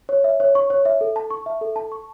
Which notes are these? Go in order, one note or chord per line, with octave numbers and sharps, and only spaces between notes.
C#5
E5
C#5
C#6
C#5
E5
A4
A5
C#6
E5
A4
A5
C#6